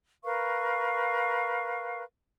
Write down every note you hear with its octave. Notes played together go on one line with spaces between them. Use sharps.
A#4 B4 F5 C#6